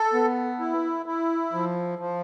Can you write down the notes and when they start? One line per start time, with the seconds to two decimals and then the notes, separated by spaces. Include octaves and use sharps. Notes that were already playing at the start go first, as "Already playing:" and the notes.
Already playing: A4
0.13 B3
0.60 E4
1.06 E4
1.53 F3
1.99 F3